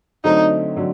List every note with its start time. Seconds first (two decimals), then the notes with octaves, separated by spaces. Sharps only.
0.24 D3 F#3 A3 C4 D#4
0.77 D3 F#3